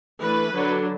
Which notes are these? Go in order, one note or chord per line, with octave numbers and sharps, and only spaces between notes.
E3 A3 D4 B4
D3 F#3 D4